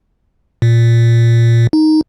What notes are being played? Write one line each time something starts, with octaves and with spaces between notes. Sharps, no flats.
A#2
D#4